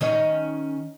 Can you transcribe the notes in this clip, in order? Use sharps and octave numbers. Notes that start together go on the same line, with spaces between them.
D#3 C#4 D#5